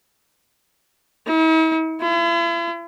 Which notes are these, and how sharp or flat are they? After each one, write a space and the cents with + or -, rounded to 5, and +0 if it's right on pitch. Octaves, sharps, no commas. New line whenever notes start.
E4 -45
E4 +45